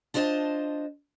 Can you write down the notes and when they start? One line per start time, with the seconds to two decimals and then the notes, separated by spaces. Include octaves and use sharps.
0.14 D4 F4 C5 D#5 E5 A5